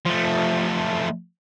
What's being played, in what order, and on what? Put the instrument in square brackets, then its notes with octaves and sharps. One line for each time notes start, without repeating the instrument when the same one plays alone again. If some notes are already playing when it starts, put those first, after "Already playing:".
[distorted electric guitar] F3 A3